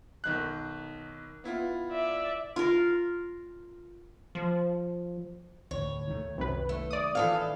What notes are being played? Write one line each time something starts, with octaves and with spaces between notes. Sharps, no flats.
B1 D#3 F#6
B3 E4 F4
D5 E5
F4 A#4
F3
D2 A2 C#5
D#3 F#3 A3
C2 F#2 D#3 F#3 B4
A3
D5 D#6
E3 A4 F5